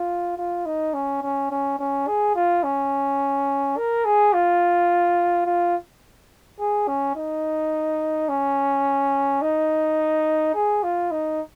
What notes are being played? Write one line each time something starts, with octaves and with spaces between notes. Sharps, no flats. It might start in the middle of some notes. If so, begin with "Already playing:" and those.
Already playing: F4
F4
D#4
C#4
C#4
C#4
C#4
G#4
F4
C#4
A#4
G#4
F4
F4
G#4
C#4
D#4
C#4
D#4
G#4
F4
D#4